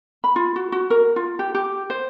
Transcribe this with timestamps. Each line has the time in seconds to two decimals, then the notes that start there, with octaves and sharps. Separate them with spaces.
0.24 B5
0.36 F4
0.56 F#4
0.72 F#4
0.90 A#4
1.16 F4
1.39 G4
1.55 G4
1.90 C5